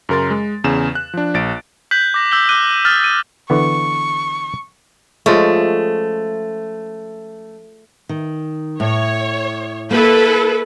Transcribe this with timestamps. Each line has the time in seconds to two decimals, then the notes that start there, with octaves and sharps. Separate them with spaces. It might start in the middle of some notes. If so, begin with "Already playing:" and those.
0.09 F#2 C#3 A#4 C6 A6
0.30 G#3
0.64 E2 C#3 E7
0.95 F#6
1.14 F3 D4
1.34 A#1 A6 D7
1.91 F#6 G6 B6 F#7
2.14 D6 A#6
2.31 D6 E6 G6 F#7 G7
2.49 D6 F#6 D#7 G7
2.85 D#6 F6 A6
3.01 F6 D#7
3.50 D3 E3 B3 C#6
5.26 F3 G#3 A3 C#4
8.09 D#3
8.80 A2 C#5
9.91 A#3 E4 A4 B4